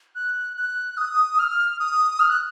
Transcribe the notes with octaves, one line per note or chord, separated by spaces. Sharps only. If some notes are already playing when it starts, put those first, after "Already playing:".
F#6
F#6
D#6
F6
D#6
F6
F#6